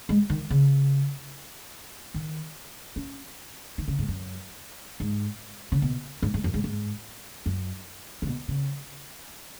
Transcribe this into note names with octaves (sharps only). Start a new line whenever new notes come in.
G#3
D#3
C#3
D#3
C#4
D#3
C#3
G#2
F#2
G#2
C#3
B2
G#2
G#2
F#2
G#2
G#2
F#2
C#3
B2
C#3